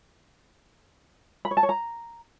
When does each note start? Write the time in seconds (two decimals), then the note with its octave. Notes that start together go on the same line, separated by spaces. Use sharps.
1.45 B5
1.51 C#5
1.57 A5
1.63 C#5
1.69 A#5